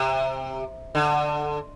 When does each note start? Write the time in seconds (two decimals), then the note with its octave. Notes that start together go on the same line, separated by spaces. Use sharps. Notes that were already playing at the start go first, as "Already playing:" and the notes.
Already playing: C3
0.95 D3